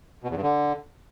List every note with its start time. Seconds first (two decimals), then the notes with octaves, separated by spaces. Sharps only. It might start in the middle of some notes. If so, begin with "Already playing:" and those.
0.24 B2
0.30 E2
0.37 G2
0.43 D3